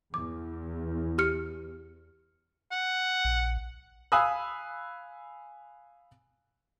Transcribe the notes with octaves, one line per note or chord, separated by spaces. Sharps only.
E2 D6
G4 F6 C#7
F#5
A#1
F5 G#5 B5 D#6 E6 F#6